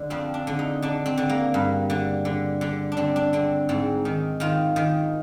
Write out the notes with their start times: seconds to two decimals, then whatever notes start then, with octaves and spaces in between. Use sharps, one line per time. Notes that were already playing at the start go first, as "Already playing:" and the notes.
Already playing: D3
0.10 F2 C4
0.34 D4
0.47 D3
0.59 D#4
0.82 D3 D4
1.06 C4
1.18 D3
1.29 A#3
1.54 G2
1.90 D3
2.25 D3
2.61 D3
2.92 D4
2.97 D3 C4
3.16 D4
3.33 D3 C4
3.69 G#2 C4
4.05 D#3
4.40 D#3 F4
4.76 D#3